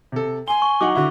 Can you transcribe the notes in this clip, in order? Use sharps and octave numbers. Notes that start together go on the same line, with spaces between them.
C3 A4
G#5 C6 G7
C#6
F#3 D#4 F#5 D6
D3 E4 F#4